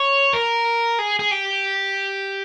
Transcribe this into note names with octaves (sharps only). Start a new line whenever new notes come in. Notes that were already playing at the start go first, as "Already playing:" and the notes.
Already playing: C#5
A#4
G#4
G#4
G4